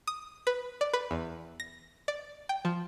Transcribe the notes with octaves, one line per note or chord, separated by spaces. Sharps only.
D#6
B4
D5
B4
E2
A#6
D5
G5
F3